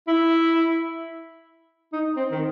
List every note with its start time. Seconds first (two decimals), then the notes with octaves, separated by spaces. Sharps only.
0.08 E4
1.93 D#4
2.16 C4
2.32 D#3